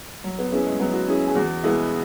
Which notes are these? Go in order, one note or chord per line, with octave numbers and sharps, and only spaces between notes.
F#3
B3
B3 C#4 E4 G#4
G#3
F#3 B3
F#4
C#4 E4 G#4
G#4
E2 F#4
B2 G#3 B3 E4